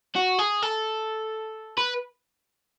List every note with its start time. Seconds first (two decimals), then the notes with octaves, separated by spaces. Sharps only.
0.15 F#4
0.38 G#4
0.62 A4
1.78 B4